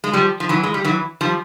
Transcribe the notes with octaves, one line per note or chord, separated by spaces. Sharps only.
G#3
F3 G3
F3
E3 F#3
G#3
G3
E3 F#3
F3 G3